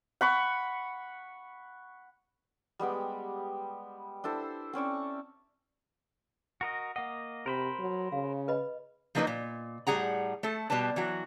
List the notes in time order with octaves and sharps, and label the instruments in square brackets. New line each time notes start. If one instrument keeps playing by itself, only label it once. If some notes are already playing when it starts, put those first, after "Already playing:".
[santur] F#5 B5 C#6
G3 G#3 B3 G4
D4 E4 A4 C5
C4 C#4 D5 C#6
[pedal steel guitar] F#4 A#4 D#5
[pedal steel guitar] A#3 D#5 [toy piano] F#5
[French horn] C3 [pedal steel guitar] A#4 C5 B5
[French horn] F#3
[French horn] C#3 [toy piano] F5
[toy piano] B4 D#5 B5
[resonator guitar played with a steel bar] F3 F#3 A#3 D#4 B4 D#5
A#2
A2 G3 G#4 F#5 A#5
A3 A4
B2 G3 G4 B4 A5
E3 F#3 F#4